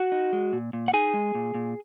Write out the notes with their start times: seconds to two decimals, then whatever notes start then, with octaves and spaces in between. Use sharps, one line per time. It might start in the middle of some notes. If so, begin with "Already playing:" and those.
Already playing: F#4 F#5
0.12 D#4
0.33 G#3
0.53 A#2
0.73 A#2
0.88 F#5
0.94 D#4 G#4 G#5
1.14 G#3
1.35 A#2
1.55 A#2